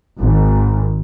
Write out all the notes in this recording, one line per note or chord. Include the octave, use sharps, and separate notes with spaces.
G#1